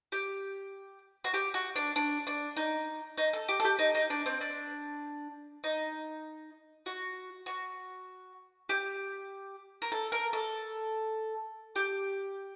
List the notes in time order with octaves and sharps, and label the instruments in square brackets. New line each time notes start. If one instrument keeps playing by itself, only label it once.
[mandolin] G4
F#4
G4
F#4
D4
D4
D4
D#4
D#4
A4
G4
A4
G4
D#4
D#4
D4
C4
D4
D#4
F#4
F#4
G4
A#4
A4
A#4
A4
G4